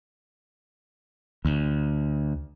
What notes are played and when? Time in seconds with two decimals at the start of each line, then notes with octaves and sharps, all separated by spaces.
1.45 D2